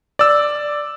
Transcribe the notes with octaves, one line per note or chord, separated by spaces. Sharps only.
D5 E6